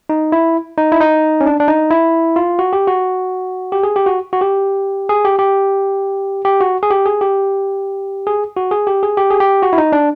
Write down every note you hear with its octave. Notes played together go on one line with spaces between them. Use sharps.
D#4
E4
D#4
E4
D#4
C#4
D4
D4
D#4
E4
F4
F#4
G4
F#4
G4
G#4
G4
F#4
F#4
G4
G#4
G4
G4
G4
F#4
G#4
G4
G#4
G4
G#4
F#4
G#4
G4
G#4
G4
G#4
G4
F#4
E4
D#4
D4